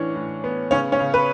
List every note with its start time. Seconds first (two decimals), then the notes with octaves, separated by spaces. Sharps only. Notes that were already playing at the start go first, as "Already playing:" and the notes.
Already playing: A2 E3 C#4 D4 C#5
0.15 A2
0.44 B3
0.71 C#3 C#4 C#5
0.92 C#4 C#5
0.99 C#3
1.14 B4